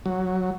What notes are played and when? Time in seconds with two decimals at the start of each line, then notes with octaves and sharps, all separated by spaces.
0.06 F#3